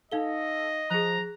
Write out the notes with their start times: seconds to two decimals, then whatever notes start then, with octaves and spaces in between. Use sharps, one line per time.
0.12 D#4 A4 D#5 F5 G7
0.90 F3 G#4 A#5 F#6